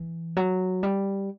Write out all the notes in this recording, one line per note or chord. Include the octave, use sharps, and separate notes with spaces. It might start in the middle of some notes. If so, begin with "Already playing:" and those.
Already playing: E3
F#3
G3